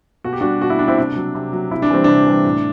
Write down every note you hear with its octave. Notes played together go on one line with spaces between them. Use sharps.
B2 F#4
G4
G3 D4 F#4
B2 F#4
E4
G3 D4
C4 E4
C3 D4
F#3
C3
F#3
C3 E4
D4
E3 G3 C4
C3 D4
E3 G3
A2